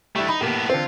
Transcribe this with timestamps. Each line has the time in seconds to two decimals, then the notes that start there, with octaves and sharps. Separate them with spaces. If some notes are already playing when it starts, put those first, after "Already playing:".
0.16 G3 A3 D4 E4
0.28 D#4 B5
0.41 A2 A#3 B3 G4
0.70 D3 C4 F4